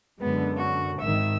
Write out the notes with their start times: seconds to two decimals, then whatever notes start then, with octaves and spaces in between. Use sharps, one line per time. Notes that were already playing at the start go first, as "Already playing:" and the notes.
0.19 F#2 D3 G#3 B3
0.57 F#4
1.00 G#1 D#3 E5 E6